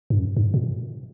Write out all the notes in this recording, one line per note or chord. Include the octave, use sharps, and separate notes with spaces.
G2
F#2
G2
A#2